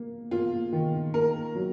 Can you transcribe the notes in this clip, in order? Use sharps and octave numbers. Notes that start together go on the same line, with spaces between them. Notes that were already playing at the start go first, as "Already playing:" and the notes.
Already playing: A#3
A#3 F4
D#3
A#3 A#4
F#3